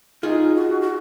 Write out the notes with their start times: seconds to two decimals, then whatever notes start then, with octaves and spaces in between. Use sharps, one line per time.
0.23 D#4 F4 G#4
0.55 F#4
0.81 F#4